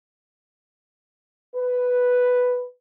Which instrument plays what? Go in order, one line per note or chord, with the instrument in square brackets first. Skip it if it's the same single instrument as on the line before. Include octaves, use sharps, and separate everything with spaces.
[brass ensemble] B4